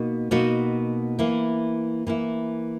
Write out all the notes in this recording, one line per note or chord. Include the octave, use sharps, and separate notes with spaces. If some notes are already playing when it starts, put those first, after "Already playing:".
Already playing: B2 A#3 D#4 F#4
B2 A#3 D#4 F#4
E3 A#3 E4
E3 A#3 E4